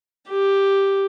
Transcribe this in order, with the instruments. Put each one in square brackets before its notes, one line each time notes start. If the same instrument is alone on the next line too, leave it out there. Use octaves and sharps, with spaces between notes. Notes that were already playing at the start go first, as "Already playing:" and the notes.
[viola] G4